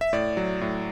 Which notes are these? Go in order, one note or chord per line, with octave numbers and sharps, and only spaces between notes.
E5
A2 D5
F#3
A2